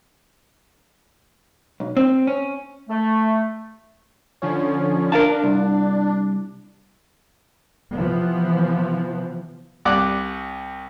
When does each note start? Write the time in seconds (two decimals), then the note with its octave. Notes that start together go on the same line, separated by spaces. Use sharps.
1.80 B1
1.97 C4
2.27 C#4
2.89 A3
4.42 D3 F3 C#4
5.12 D4 A#4 F5 A5
5.43 C2
7.94 C3 E3 F3 B3
9.85 C2 D5 F#5 D6